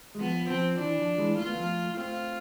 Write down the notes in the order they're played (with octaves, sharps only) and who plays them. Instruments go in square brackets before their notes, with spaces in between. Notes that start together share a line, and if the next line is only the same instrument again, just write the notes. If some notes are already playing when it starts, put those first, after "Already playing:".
[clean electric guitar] G#3
[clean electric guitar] F3 [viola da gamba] B3
[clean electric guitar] F3 [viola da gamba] C4
[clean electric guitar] E3 [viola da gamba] D4
[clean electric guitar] F3
E3 G#3
[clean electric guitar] A3 [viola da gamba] F4
[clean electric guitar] B3
F3 A3
[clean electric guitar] A3 C4 [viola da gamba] F4